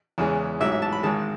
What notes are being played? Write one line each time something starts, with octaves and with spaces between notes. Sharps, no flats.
E2 C#3 E3 G#3
A1 G#2 F#3 E5
E5
A5
B5
G#1 G#2 D#3 G#3 A5